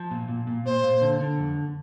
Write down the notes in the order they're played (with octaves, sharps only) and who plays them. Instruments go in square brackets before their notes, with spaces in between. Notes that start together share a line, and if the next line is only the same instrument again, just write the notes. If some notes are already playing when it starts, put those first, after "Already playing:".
Already playing: [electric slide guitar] F3
A#2
A#2
A#2
[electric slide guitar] A#2 [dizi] C5
[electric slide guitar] A#2
D3
D3
F2